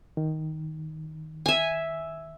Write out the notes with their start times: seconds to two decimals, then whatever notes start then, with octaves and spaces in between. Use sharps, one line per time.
0.17 D#3
1.46 E5 G#5